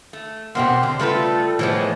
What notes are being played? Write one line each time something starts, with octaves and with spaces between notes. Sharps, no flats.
A3
E2 G#2 B2 A#3 C4 G4 F#5 C6
D3 C6
C#3 G3 A3 F4 A4 B4
A2 E3 F3 G3 G#3 B3